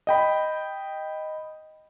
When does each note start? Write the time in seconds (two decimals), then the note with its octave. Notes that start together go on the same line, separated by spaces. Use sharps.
0.07 D#5 G5 B5